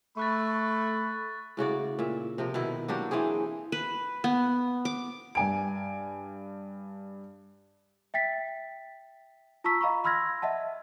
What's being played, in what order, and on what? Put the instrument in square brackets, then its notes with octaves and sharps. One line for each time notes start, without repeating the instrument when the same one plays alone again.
[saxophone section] A3 [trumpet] B5 [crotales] C#6 F#6 A6
[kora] A2 C#3 F#4 D5
A#2 E5
C3 F3 A#4
B2 D#3 E4
F#3 A#3 D4 G4
E3 A#3 C4 G#4
[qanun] B4
B3
D6
[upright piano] G2 G#5 D7
[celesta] E5 G5 A6 B6
F4 A5 A#5 C#6 E6 B6
D#5 F5 A#5 B5 C#6
B5 C6 E6 F6 G#6 A#6
D#5 E5 F#5 A5